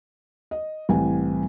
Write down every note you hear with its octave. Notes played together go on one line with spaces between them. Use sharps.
D#5
C2 A2 E3 C4 G#5